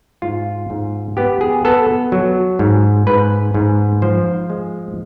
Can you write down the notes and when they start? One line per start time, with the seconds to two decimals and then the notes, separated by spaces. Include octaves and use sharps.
0.22 G#2 F4
0.70 G#2
1.17 B3 G4
1.41 G#4
1.65 B3 A4
2.12 F#3
2.59 G#2
3.07 G#2 B4
3.54 G#2
4.02 F3 C5
4.50 G#3